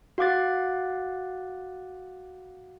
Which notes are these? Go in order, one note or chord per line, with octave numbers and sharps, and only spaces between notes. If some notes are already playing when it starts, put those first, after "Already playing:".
F#4 F5 F#5 D6 F#6 A6